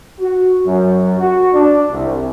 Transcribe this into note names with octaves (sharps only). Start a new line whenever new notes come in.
F#4
F#2
F#4
D4
C2